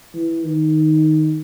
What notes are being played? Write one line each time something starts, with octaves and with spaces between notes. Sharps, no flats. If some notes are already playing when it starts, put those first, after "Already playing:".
E3
D#3